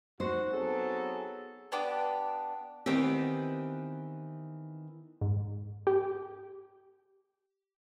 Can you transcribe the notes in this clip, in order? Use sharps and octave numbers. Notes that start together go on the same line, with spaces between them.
D#4 F#4 C5
F#3 B3 C4 G#4 A4
B3 D4 G4 D6
D#3 E3 B3 C4 G4
G#2
G4